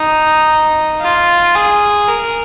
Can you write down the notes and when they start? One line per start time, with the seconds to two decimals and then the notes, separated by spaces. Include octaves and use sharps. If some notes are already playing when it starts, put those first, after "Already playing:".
Already playing: D#4
1.01 F4
1.55 G#4
2.08 A#4